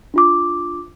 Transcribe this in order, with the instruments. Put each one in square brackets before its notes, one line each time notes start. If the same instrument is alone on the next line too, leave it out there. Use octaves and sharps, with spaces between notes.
[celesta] D4 F4 D6